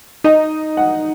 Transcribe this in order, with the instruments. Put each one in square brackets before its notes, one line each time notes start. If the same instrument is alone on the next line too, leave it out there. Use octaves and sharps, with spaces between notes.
[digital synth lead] D#4 [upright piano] D#5
[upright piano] F#5